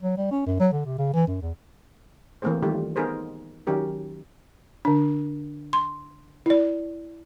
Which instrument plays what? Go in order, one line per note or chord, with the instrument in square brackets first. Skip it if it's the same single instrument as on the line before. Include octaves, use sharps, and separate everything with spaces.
[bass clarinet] F#3
G3
C#4
F#2
F#3
D3
C3
C#3
E3
F#2
E2
[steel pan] E3 A3 A#3 C4 G#4 C5
D#3 G3 A3 F4 G4
B3 D#4 G#4 A#4 C5
D#3 F#3 C#4 G4 A#4
[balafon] D3 D4
C6
E4 D5